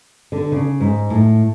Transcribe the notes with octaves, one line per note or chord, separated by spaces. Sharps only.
D3
C#3
G#2
A2